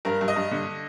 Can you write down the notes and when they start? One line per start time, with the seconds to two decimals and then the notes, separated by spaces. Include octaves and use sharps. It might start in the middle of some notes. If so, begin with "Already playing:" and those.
0.05 G2 A#4
0.21 G2
0.28 D#5
0.36 G2
0.51 D3